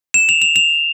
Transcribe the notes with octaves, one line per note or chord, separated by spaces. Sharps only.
E7
F7
F7
F7